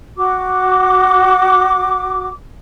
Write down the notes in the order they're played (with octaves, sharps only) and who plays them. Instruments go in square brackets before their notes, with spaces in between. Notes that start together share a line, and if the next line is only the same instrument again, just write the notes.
[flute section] F#4 D6